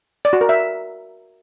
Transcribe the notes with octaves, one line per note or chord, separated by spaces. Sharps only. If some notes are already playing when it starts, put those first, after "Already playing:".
D5
F#4
A#4
E5